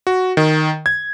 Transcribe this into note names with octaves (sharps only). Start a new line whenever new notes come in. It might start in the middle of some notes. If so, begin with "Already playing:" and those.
F#4
D#3
G#6